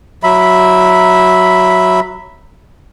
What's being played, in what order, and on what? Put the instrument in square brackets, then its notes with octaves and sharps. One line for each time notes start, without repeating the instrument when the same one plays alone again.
[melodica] F#3 E5 B5